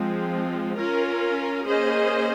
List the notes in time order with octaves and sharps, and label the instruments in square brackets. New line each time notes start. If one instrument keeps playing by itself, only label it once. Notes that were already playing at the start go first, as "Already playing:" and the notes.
Already playing: [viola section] F3 G#3 C4
C#4 F4 A#4
A#3 C#4 G#4 C5 D#5